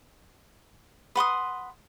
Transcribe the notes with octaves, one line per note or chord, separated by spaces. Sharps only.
B4 F#5 C6 D#6